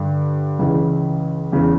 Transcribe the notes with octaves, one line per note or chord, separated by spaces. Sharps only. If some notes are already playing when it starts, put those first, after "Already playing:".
Already playing: G2 D3
C#2 C#3 E3
E2 C#3 E3